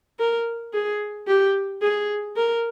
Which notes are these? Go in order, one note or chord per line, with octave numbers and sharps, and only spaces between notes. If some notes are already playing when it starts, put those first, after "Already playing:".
A#4
G#4
G4
G#4
A#4